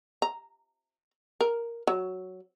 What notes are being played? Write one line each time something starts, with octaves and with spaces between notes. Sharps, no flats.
A#5
A#4
F#3